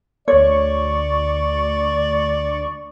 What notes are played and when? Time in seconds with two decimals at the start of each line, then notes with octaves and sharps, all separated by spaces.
0.28 D2 C#5 D5 C#6